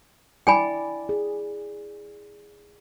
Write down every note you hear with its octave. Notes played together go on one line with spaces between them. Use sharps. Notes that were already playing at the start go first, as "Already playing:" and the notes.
E4 D5 G5 G#5 B5
G#4